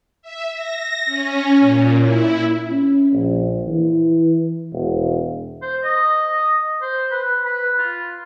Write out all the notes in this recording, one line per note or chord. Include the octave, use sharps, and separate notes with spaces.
E5
A#6
C#4
A#2
E4
C#4
A#1
E3
E1
C5
D#5
C5
B4
B4
F4